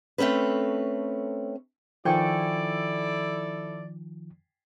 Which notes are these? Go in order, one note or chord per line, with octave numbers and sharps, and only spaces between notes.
A3 C4 C#4 A4 B4
D#3 F3 E4 A4 D5 G5 G#5 C#6